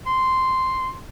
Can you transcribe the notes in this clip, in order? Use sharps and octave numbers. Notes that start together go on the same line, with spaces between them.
C6